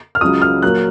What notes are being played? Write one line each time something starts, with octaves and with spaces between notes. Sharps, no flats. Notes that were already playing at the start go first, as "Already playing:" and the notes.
F6
C#2 C#3 F#3 D#6
F6
A#2 F#3 A#3 F#6